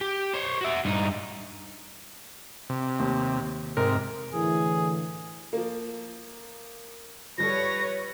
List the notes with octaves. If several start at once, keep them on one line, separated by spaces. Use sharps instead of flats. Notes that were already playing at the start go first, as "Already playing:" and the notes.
G4
C5 C#5
F#4 E5
G2 D#4
C3
D#2
G#2 C3 A#4
A2 D3 E3 G#4
F3 A#3
F3 G3 A4 B4 C#5 A#6